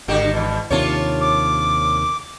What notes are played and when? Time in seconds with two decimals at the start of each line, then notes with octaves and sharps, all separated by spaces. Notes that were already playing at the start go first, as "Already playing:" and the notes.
0.08 G#1 D3 F#4 G4
0.34 E2 B2
0.70 D#2 C3 D#3 D4 F4 C#5
1.21 D6